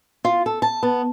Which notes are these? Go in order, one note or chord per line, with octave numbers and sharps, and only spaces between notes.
F4
A4
A5
B3